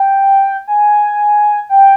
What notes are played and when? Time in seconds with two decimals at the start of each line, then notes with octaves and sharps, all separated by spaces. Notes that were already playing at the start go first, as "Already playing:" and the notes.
Already playing: G5
0.67 G#5
1.69 G5